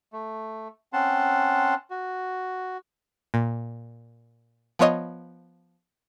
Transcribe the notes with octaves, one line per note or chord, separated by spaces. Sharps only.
A3
C4 C#4 F#5 A5 C6
F#4
A#2
F3 B3 F4 C#5 D#5